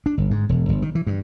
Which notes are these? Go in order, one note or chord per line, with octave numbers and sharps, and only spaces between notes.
D4
G1
G#2
E1
G1
D#3
E3
G2